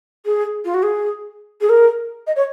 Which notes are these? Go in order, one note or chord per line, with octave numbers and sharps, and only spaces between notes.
G#4
F4
F#4
G#4
G#4
A#4
D#5
C#5